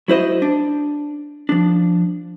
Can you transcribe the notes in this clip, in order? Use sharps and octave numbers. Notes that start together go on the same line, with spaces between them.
F#3 E4 C5 D#5
D4
F3 D4